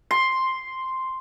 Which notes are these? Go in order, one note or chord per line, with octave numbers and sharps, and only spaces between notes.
C6